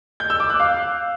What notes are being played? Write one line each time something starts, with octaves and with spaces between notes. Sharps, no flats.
G6
E6
D6
F#6
F5